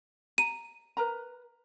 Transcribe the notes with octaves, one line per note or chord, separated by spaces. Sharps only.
A#5 D#7
A#4 B4 A#5